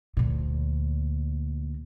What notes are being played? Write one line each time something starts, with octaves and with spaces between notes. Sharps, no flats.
D2 A#2